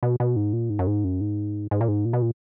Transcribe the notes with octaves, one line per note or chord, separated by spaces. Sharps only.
B2
B2
G#2
A#2
G#2
F#2
G#2
F#2
G#2
G#2
A#2
G#2
A#2
B2
A#2